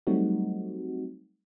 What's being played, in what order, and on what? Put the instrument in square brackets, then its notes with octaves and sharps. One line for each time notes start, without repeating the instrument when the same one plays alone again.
[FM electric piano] F#3 G3 A3 C4 D#4 F#4